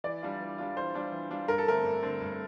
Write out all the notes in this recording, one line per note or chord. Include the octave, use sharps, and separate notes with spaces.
E3 D5
G3 D4 F4
E3
G3 D4 F4
E3 C5
G3 D4 F4
E3
G3 D4 F4
G2 A#4
A4
D3 A3 C4 A#4
G2
D3 A3 C4
G2